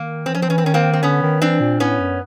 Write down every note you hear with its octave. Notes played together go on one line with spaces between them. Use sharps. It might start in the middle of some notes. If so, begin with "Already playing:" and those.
Already playing: D#3 A#3
E3 C4
F3 C#4
C4
E3 C#4
C4
D#3 C#4
A#3 C4
C4
D3 B3 C#4
D#3
E3 C4 D4
A#2
A2 B3 C#4
F#2